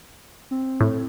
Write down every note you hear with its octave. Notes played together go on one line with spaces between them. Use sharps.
C4
A2